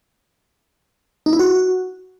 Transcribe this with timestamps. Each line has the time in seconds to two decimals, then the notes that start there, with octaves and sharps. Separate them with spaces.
1.26 D#4
1.33 E4
1.39 F#4